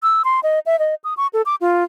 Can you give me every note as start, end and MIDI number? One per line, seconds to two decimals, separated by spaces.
0.03 0.22 88
0.24 0.40 84
0.43 0.59 75
0.66 0.79 76
0.79 0.95 75
1.04 1.14 87
1.17 1.27 85
1.33 1.42 69
1.46 1.55 86
1.61 1.84 65